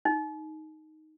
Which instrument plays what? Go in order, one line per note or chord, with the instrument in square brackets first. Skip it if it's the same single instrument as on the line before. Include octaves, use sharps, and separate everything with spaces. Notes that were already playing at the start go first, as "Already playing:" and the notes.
[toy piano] D#4